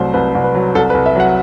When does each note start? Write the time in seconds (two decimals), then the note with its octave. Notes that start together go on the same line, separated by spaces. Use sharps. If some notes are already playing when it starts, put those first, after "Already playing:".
Already playing: C2 F#3 A3 C5
0.14 C2 B4
0.35 C2
0.44 B4
0.55 F#3
0.75 C2 A4
0.90 B4
0.94 C2
1.06 E5
1.16 F#3 F#5